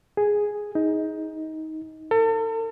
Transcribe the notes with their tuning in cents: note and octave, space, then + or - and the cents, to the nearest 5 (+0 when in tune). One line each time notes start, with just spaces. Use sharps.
G#4 +0
D#4 +20
A4 +40